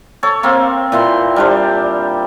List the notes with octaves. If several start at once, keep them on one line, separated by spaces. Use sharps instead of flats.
A4 C#5
A#3 C4 F5
A#2 E3 C6
G3 D4 C5